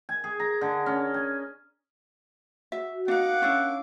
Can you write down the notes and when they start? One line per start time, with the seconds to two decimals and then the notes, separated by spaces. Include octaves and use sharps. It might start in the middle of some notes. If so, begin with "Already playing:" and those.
0.09 G#5
0.24 G#4
0.40 A#5
0.61 D3
0.86 C#4
1.14 G#5
2.72 F#4 E5
3.08 D4 D#4 F5 F#5 D6
3.42 C#4 D4 E4